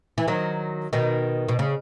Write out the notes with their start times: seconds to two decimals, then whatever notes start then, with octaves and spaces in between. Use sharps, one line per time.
0.18 E3
0.28 D#3 F#3
0.93 B2 D#3
1.49 B2
1.59 C#3